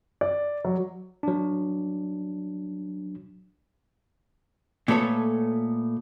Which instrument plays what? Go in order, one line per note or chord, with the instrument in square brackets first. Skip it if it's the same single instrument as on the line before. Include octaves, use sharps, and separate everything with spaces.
[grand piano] D5
F#3
[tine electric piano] F#3 D4
[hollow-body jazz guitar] A#2 A3 B3 A4 C#5